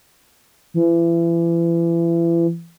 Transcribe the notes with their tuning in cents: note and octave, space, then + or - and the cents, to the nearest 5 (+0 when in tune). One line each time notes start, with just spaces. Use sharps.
E3 +35